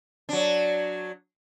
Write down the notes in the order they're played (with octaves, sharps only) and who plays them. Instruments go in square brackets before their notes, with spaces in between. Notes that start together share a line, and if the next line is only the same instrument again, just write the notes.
[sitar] F#3 D4